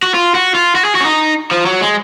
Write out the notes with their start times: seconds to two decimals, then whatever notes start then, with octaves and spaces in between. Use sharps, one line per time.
0.03 F#4
0.14 F4
0.35 F#4
0.55 F4
0.75 F#4
0.85 G#4
0.95 F#4
1.01 C#4
1.05 D#4
1.51 F3
1.66 F#3
1.81 G#3